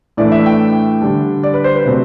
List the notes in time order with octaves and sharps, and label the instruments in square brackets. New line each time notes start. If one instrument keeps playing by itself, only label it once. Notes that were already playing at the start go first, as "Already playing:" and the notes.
[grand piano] A2 E3 A3 D4 D5
E5
G5
D3 G3 D4
D5
B4
C5
B4
C3 F#3 A3 C4